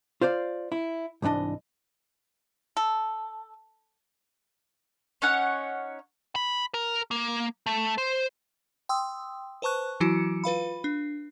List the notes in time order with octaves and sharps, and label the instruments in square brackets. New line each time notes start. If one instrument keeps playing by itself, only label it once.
[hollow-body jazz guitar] F4 C5 D5 F5
E4
C2 G#2 E3 D4 D#5
[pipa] A4
[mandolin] C#4 D#4 C#5 F#5
[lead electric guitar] B5
A#4
A#3
A3
C5
[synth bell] G5 C6 D#6 E6
B4 C5 A5 C#6 F#6
E3 F#3 E4 F#4 C#7
F4 B4 F5 B5
D4